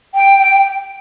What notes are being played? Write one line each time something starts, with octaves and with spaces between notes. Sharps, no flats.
G5
G5